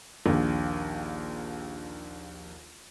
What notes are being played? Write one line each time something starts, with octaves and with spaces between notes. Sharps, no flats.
A#1 D#2